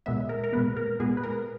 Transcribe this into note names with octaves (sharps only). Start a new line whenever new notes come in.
A#2 G#3 B3 E5
A#4
A#4
A#2 G#3 B3 B4
A#4
A#2 G#3 B3 G#4
B4
A#4